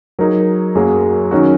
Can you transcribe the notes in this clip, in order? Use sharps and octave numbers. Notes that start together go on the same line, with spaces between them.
F#3 D#4 G#4 A#4
F#2 F#3 A#3 G#4
D#3 F#3 C#4 D#4 F#4